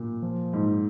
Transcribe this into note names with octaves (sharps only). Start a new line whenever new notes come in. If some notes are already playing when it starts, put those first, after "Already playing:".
Already playing: A#2
F3
G#2